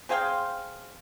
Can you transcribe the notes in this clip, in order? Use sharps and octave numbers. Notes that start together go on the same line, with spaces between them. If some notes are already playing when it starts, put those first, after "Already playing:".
C4 G#4 F5 G5